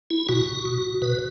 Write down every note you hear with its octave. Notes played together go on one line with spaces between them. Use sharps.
E4
B2 F#4
B2
B2 B4